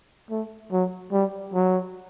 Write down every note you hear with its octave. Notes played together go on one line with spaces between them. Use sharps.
A3
F#3
G3
F#3